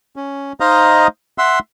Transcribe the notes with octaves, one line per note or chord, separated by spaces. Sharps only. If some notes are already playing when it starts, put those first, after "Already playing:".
C#4
D#4 C5 D#5 F5 A#5 D#6
E5 F#5 C6 E6